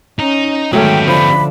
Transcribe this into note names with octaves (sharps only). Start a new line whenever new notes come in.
C#4 D#4
D#3 F#3 G#3 A3 B3 C#4 G4 G5
D3 F3 D4 B5